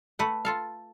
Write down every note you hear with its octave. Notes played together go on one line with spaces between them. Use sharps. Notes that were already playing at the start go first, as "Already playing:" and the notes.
A3 B4 F#5
F4 A4 F5